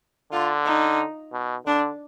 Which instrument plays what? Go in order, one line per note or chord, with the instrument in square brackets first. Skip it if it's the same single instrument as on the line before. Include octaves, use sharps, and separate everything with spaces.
[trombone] D3 [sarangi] F4
[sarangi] D#4
[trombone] B2
[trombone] D3 [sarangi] D4